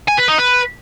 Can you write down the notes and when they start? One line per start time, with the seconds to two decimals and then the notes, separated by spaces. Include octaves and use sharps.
0.08 G#5
0.18 B4
0.28 D#4
0.38 B4